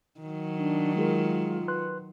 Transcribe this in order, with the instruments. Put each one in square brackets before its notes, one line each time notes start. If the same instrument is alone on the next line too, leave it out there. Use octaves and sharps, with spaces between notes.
[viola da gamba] D#3 F#3
[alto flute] D4
[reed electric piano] G#3 G#4 A#4 [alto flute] F4
[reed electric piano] B4 C6 F#6